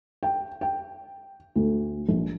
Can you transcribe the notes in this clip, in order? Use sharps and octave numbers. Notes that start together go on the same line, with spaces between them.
G5
G5
D2
A#1